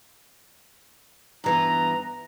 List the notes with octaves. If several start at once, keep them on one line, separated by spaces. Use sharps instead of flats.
G2 E3 B3 A#5